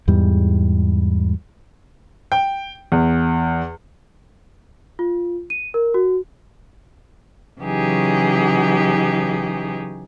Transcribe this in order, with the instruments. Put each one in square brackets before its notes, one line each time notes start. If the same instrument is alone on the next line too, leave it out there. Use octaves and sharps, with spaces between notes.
[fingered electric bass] E2 G#2 G3
[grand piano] G5
E2
[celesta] F4
D#7
A#4
F#4
[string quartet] C#3 E3 F#3 D#4 G4 G#4